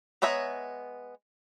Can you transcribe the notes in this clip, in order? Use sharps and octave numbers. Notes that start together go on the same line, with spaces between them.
G#3 B3 C#5 E5 A#5